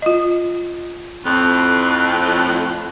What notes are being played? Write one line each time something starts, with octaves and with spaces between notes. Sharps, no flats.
F4 D#5
F2 A2 F#6